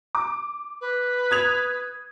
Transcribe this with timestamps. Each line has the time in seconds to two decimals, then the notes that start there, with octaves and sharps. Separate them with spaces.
0.15 D6
0.81 B4
1.31 D#6 G#6 F7